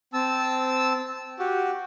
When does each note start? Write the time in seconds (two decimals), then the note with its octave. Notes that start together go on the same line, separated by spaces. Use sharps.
0.13 C4 A5 E6
1.39 F#4 G4